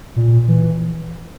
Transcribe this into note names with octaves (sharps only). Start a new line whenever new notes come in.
A#2
E3